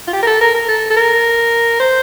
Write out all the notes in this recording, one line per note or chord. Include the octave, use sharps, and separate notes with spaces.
F4
G4
A#4
A4
A#4
A#4
A4
A4
A#4
C5